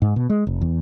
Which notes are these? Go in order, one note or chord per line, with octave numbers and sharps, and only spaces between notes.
G#2
B2
G#3
F1
E2